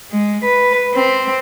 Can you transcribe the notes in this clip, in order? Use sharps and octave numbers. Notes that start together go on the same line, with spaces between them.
G#3
B4
C4